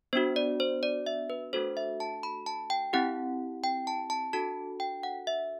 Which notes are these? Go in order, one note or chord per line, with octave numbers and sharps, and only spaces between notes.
B3 D4 F#4 C5
D5
C5
D5
E5
B4
A3 D4 F#4 A4 C5
E5
A5
B5
A5
G5
C4 E4 G4 F#5
G5
A5
A5
D4 F#4 A4 A5
G5
F#5
E5